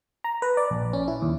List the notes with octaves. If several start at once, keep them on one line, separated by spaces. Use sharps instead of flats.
A#5
B4
D5
A#1
C#4
E4
D#2